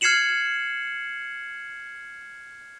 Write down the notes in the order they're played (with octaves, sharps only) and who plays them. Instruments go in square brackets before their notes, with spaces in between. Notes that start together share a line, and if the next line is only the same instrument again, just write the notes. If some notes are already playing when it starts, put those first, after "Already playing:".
[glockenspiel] F6 G#6 C7 C#7 E7 F#7